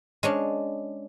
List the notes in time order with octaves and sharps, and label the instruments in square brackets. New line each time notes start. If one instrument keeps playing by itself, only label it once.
[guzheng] G#3 C#4 D4